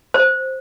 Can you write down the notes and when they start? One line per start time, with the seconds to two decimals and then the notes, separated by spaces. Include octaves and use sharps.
0.14 C5